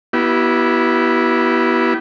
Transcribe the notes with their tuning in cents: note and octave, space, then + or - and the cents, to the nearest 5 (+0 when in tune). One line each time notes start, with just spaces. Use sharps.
B3 -20 E4 +0 G4 -35